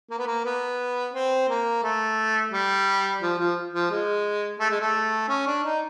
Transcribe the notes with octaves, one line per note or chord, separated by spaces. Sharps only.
A#3
B3
A#3
B3
C4
A#3
A3
G3
F3
F3
F3
G#3
A3
G#3
A3
C#4
D4
D#4